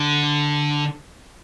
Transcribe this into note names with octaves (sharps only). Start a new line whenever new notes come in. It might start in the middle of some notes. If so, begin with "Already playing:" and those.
Already playing: D3